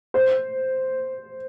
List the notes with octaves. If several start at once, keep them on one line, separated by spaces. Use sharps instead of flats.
C5